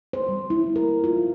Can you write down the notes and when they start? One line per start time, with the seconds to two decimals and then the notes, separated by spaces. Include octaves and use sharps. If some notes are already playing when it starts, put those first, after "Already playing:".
0.13 C5
0.29 G3
0.50 E4
0.76 A#4
1.04 F4